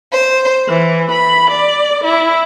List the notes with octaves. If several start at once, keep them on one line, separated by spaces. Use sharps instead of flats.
C5
E3
B5
D5
E4